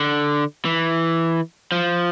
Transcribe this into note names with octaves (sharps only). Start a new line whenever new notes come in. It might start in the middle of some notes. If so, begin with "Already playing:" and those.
Already playing: D3
E3
F3